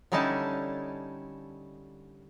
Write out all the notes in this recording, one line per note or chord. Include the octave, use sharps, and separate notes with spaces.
D3 G3 C#4 D#4 E4 A5